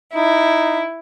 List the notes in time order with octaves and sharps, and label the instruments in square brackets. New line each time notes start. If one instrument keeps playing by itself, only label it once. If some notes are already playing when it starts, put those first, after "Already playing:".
[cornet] D#4 [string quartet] E4